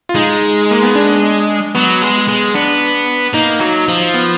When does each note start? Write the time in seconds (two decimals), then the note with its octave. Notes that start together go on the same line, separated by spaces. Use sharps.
0.09 F4
0.15 G#3 D#4
0.71 A#3
0.83 B3
0.95 D4
1.75 F#3 B3
2.02 G#3
2.28 G#3
2.54 B3 D4
3.34 A#3 D#4
3.61 F#3
3.88 F3
4.14 B3